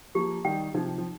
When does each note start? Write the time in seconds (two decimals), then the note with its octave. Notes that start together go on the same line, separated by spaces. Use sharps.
0.15 F3 A#3 G4
0.45 D#3 G3 G5
0.74 C3 F3 D#4
0.98 F3